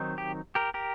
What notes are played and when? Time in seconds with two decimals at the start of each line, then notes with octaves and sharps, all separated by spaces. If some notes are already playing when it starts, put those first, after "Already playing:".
Already playing: D#3 F#3 C4 D#4
0.18 G4
0.55 G4 A#4
0.74 G4 A#4